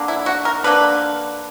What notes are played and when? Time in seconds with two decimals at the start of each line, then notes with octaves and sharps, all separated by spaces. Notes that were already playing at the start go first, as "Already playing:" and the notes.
Already playing: D3 A#3 D4
0.08 E4
0.26 F#4
0.45 A#4
0.64 D3 A#3 D4 B4